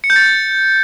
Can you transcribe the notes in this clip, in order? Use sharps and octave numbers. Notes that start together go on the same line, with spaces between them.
C#7
G6
A6